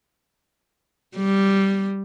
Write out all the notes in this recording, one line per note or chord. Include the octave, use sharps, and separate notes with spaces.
G3